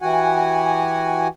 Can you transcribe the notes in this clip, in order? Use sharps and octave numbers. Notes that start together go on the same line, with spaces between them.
E3 F#4 G4 F#5 G#5